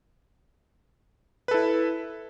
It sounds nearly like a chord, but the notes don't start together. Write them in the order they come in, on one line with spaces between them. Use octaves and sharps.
B4 A4 E4